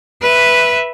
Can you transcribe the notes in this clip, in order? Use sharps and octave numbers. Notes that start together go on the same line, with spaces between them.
B4 E5